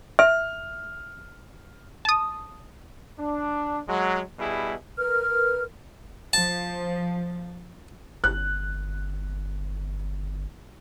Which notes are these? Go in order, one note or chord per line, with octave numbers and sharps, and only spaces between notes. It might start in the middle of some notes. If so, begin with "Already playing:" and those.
E5 F6
A5 D#6
D4
F#3 G#3
B2 G3 E4 G#4
A#4 B4 F6
F3 A5
G1 F#6